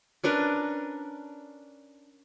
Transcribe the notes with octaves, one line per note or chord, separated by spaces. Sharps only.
C#4 D4 A#4 B4